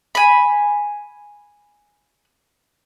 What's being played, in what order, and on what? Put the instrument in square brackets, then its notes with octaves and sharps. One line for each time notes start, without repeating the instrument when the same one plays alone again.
[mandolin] G#5 B5